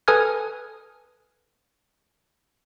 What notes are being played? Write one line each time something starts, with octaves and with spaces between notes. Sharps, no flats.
A4 B4 G#5 D#6 F6 G#6